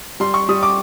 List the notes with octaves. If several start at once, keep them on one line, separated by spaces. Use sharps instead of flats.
G3 C6
C#6
G3 D#6
D6